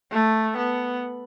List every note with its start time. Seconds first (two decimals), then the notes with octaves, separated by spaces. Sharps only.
0.11 A3
0.57 B3